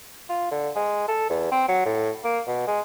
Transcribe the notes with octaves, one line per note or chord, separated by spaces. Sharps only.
F4
D3
G#3
A4
E2
C4
F#3
A2
A#3
B2
G#3